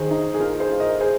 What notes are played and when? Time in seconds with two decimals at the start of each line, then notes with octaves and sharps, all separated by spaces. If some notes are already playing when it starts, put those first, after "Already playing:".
Already playing: D#3 G#4 C5
0.11 D#4
0.34 G#4
0.40 F4 A#4
0.60 G#4 C5
0.71 F4
0.80 A#4 D#5
1.00 G#4 C5